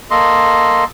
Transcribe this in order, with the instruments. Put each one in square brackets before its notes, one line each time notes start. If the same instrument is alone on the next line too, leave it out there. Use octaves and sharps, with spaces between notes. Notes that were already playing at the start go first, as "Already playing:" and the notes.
[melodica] A#3 A4 D#5 C6